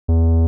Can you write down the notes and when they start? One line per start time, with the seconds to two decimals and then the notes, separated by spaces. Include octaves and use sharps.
0.08 E2